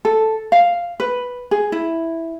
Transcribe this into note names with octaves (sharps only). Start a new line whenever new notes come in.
A4
F5
B4
G#4
E4